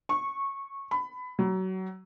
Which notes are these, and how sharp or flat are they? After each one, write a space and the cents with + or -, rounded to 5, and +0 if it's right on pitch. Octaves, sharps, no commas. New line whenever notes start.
C#6 -15
B5 +20
F#3 +25